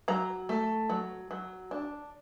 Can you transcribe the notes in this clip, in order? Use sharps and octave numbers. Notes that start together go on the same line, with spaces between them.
F#3 A#5
A3
F#3
F#3
D4